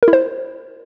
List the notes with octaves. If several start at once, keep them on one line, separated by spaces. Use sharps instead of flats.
A#4
E4
C5